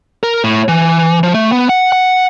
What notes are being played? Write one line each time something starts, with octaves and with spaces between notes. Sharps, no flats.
A#4
A2
E3
F3
A3
B3
F#5
F#5